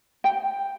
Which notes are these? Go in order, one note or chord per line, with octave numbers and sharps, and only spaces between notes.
G5